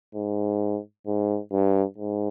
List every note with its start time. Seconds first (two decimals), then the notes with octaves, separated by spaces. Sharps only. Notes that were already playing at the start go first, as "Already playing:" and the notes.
0.15 G#2
1.07 G#2
1.52 G2
1.98 G#2